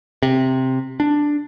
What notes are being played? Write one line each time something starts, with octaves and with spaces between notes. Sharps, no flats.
C3
D4